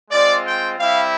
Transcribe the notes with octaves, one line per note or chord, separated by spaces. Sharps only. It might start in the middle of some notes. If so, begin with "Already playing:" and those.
G#3 C4 F4 D5
G5
G3 C4 E4 G4 F5